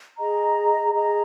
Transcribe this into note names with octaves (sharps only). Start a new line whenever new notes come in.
G#4 D#5 A#5
G#4 D#5 A#5